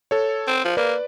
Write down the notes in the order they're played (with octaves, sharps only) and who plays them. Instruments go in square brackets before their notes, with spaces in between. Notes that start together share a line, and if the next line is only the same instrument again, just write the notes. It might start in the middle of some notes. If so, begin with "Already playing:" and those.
[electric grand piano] A4 C#5
[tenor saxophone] C4
F3
[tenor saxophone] A#3 [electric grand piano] B4 D5